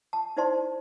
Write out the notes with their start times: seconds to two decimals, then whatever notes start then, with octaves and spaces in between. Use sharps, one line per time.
0.13 A5
0.37 D#4 E4 C5 D5 A5 C6